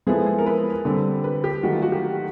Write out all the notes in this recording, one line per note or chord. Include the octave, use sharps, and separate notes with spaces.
F3 G#3 B3 E4 G#4 A4
G#4
A#4
B4
D3 G3 C4
B4
G4
D#3 F#3 A3 F#4
F4
F#4
G4